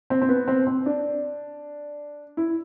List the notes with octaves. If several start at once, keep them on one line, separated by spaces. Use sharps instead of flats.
C4
C4
B3
C4
C4
D4
E4